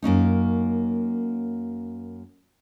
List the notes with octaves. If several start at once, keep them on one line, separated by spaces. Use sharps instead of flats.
F#2 A#3 C#4 D#4